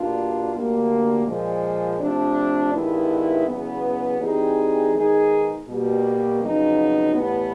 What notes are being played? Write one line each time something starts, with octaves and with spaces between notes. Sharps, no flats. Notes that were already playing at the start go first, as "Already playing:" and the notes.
Already playing: B2 G3 A#3 D4 F4
D2 D3 G3 A#3
A#2 F3 G#3
C3 F3 A3 D4
G2 D#3 G#3 B3 E4
E2 C#3 F#3 B3
E3 G3 C4 D#4 G#4
D#3 G#3 B3 D#4 G#4
B2 G3 A#3
F2 C#3 F#3 B3 D#4
A2 E3 G3 B3